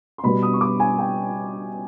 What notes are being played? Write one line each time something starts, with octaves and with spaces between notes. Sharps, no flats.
C6
B2 G3 B3 B5
D#6
C#6
D6
G#5
G5